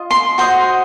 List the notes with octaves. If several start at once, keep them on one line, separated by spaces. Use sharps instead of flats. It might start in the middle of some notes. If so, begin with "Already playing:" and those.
Already playing: F4 D#5
C6
F#4 C5 D#5 C6